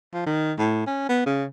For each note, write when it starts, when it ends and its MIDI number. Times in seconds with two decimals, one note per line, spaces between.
0.14 0.24 53
0.26 0.53 51
0.58 0.86 45
0.87 1.06 61
1.09 1.25 59
1.26 1.45 49